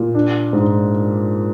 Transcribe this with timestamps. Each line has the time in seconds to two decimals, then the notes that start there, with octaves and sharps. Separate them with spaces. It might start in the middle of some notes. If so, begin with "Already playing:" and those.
Already playing: A#2
0.15 D4
0.53 G#2